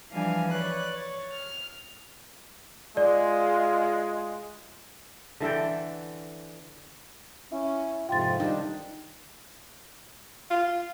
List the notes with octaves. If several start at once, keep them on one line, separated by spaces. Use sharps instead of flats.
E3 F3 G3 D4 F5 G#5
B4 C#5 D5 F#6
C#5 A6
F6
G#3 F4 D5
D3 E3 A4 G5
C#4 E4
F2 G#2 C3 F4 G5 C6 A6
D#3 G3 D4
F4